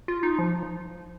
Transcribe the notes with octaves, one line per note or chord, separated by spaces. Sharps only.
F4
D#4
F3